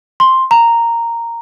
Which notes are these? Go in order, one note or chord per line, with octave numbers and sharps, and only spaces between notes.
C6
A#5